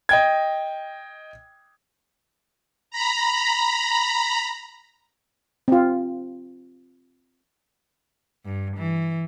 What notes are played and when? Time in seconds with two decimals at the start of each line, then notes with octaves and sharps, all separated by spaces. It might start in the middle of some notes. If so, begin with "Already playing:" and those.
0.09 D#5 G5 G#6
2.91 A#5 B5
5.68 C4 F4
8.45 G2
8.77 E3